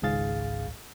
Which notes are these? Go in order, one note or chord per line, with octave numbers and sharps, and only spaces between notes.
G#1 C#2 G#2 G#4 F5 A6